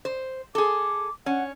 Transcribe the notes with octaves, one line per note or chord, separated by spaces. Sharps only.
C5
G#4 A4 D6
C#4 F#5